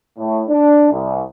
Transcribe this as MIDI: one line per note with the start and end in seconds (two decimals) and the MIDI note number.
0.18 0.43 45
0.49 0.89 62
0.91 1.22 36